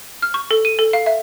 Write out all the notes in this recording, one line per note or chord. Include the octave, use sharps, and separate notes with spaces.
F6
C#6
A4
D#7
A4
F5
E5